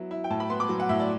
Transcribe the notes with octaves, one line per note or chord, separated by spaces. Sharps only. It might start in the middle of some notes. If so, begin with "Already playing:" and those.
Already playing: F#3 B3 E4
E4
G5
A2 A5
B5
B3 C6
D6
F#3
F#5
A2 E5
D5